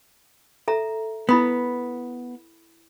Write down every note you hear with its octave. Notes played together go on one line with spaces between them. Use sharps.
A4 E5 A#5
B3 E4 B5 D#6